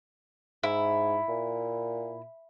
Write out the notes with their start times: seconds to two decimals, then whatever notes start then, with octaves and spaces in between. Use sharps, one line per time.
0.63 G#2 E4
1.29 A#2